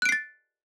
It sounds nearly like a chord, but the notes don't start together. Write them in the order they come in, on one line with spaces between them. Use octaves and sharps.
F#6 D7 C7 A6